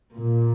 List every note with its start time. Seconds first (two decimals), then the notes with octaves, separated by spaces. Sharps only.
0.15 A#2